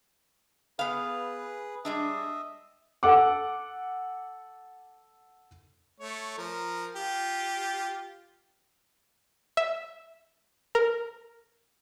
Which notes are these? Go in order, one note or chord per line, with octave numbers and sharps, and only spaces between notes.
B3 G#4 B4 F5
G3 G#3 D4 D#5 E5
A4 F#5 D6
A3 C#5
F3 A#4 A#5
F4 G4
E5
A#4